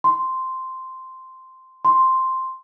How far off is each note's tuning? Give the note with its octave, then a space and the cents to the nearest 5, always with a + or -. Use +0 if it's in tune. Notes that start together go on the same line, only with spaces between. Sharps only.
C6 -5
C6 +0